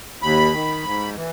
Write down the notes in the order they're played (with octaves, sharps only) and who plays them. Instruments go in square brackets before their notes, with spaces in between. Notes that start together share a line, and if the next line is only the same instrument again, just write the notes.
[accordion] D#2 B5
D#3
G#2
E3